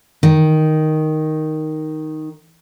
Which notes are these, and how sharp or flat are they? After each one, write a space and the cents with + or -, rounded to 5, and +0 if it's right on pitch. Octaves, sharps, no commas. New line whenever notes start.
D#3 +0